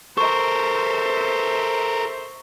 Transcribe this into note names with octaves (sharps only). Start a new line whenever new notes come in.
A4 A#4 C5 E5 C#6